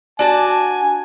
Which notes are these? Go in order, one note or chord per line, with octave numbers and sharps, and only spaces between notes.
D4 F#4 G#5 A5